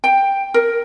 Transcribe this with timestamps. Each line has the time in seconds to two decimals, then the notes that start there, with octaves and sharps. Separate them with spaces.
0.04 G5
0.54 A#4